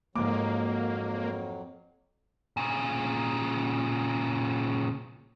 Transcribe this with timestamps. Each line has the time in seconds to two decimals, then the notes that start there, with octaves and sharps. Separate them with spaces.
0.16 F2 G#2 F#3 A#3 D6
2.57 A#2 C#3